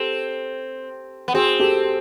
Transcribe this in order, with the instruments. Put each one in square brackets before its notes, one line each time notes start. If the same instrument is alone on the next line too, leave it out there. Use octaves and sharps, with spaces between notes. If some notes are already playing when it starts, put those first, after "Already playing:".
Already playing: [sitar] C4 [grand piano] G4 A4
[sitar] B3
[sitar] C4 [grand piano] F#4 G#4
[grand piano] G4 A4